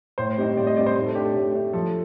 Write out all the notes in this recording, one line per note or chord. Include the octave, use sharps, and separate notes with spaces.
A2 C5
G3 C4 D#4
A2 D5
D#5
G3 C4 D#4 D5
C5
A2
A4
A3 D4 G4
A4
A2 G4
A3 D4
F3 A4